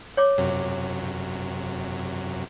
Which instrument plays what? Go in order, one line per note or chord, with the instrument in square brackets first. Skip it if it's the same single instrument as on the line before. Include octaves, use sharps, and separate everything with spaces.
[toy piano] C#5 D6
[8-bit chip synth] F#2 C3 F#3